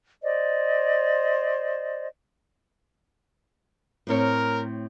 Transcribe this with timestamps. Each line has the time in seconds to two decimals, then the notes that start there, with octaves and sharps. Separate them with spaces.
0.23 C5 D5 D#5
4.07 A2 C4 A#4 C#5